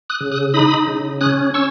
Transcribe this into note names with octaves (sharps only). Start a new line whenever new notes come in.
D#6 F#6
C#3
D#6 F#6
D#4 B5 D#6
C#3
C#4 D#6 F#6
C#4 C#6 E6